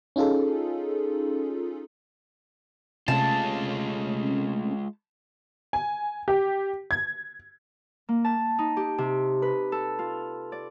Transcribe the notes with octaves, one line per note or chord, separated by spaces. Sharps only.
C#4 D#4 F4 G#4 A4
C3 G#3 A3 C#4 F4 A5
G#5
G4
G#6
A#3
A5
D#4
G4
C3
B4
A4
F4
D5